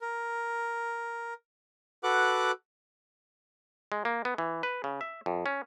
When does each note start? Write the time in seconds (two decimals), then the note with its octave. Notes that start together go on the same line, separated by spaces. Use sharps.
0.01 A#4
2.04 F#4 A4 B4 F#5 D6 F#6
3.92 G#3
4.05 A#3
4.25 B3
4.38 E3
4.63 B4
4.84 C#3
5.01 E5
5.26 F2
5.46 C#4